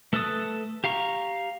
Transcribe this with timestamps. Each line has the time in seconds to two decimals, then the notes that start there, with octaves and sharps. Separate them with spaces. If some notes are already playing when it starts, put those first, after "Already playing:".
0.13 A3 A4 B4 A5 D#6
0.84 G4 F5 A#5 C#6